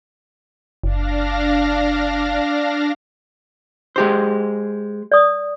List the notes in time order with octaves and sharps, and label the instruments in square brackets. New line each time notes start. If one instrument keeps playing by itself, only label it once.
[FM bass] F#1 [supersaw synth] D4 F5 A#6
[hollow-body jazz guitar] G#3 G4 C5
[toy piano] D5 D#6